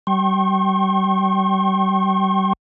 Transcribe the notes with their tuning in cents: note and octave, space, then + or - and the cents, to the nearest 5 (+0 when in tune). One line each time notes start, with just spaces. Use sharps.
G3 -35 G5 -25 C#6 -45